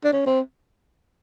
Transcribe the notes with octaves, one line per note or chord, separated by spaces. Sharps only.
D4
C#4
C4